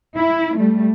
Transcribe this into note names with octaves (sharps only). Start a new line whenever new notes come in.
E4
G3 A3